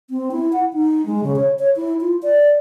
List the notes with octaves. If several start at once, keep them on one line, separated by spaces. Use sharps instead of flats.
C4
E4
F#5
D#4
G#3
C#3
C#5
C#5
E4
F4
D5